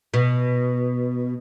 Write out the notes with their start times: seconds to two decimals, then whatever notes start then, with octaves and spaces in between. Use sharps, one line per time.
0.14 B2